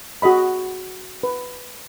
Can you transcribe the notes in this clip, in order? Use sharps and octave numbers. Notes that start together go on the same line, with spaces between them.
F#4 G#4 D#5 B5
B4